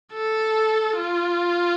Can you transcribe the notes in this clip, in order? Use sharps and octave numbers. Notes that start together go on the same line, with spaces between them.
A4
F4